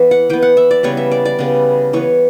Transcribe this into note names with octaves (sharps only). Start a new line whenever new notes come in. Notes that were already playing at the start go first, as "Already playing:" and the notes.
Already playing: E3 B3 E5
F#5
E3 B3 G5
F#5
E5
D5
C#3 G3 B3 C#5
E5
D5
D5
C#3 G3 B3
E3 B3 C#5